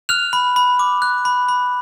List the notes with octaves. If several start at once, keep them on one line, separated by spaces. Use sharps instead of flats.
F6 F#6 F7
B5
B5
D6
F#6
B5
B5